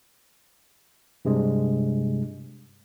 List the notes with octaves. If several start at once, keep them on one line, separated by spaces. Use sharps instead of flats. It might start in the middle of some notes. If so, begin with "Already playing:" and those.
G2 C3 G#3